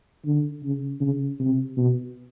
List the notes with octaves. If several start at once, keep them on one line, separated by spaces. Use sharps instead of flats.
D3
C#3
C#3
C3
B2